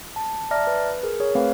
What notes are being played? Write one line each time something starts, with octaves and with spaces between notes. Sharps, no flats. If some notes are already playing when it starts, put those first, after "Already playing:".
A5
D5 E5 A5 A#5 F6 A#6
B4
G#4 A#4
G#4 C#5
A3 C4 B4 F5